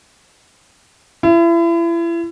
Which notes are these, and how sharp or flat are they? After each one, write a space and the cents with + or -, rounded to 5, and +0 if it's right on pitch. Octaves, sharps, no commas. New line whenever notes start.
E4 +35